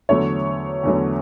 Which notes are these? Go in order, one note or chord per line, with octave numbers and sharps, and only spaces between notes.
E2 D3 F#3 A3 C#5
E2 D3 F#3 A3